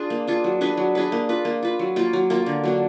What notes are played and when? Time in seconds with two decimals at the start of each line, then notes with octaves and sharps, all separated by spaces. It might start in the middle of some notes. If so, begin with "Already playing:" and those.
Already playing: D4 F4 G#4
0.10 A#3
0.27 D4 F4 G#4
0.44 F#3
0.61 D4 G#4 B4
0.77 F#3
0.95 D4 G#4 B4
1.12 A#3
1.29 F4 B4
1.45 A#3
1.62 F4 B4
1.79 F#3
1.96 A#3 F4 A#4
2.13 F#3
2.30 A#3 F4 A#4
2.46 D3
2.64 F#3 A#3 D4